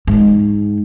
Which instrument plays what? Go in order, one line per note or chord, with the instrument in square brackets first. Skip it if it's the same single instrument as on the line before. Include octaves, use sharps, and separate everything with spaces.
[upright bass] G#2